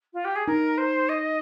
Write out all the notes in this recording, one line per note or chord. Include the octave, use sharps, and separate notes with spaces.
F4
G4
G#4
D#4 A#4
C5
D#5